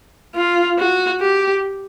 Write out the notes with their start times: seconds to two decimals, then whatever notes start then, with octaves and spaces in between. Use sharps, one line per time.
0.35 F4
0.79 F#4
1.21 G4